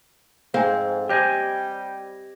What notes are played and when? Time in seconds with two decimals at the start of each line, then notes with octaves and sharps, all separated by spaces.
0.54 F2 G#2 C4 F5 G#5
1.09 G3 G4 C5 D#5 G5 G#5 G6